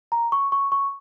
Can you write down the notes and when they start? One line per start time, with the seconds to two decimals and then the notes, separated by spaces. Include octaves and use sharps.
0.12 A#5
0.32 C#6
0.52 C#6
0.72 C#6